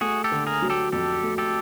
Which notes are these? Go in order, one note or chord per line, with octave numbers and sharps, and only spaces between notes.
A3 F#4 G#4
G4 A4
D3
G#4 A#4
F#3
G4 A4
F2 G4 A4
A3
G4 A4